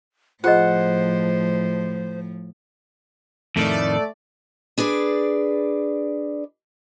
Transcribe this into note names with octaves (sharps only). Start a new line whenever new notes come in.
A2 F3 F4 G#4 C5 D#5 F#5
F2 A2 D#3 A3 D5
D4 G#4 B4 D5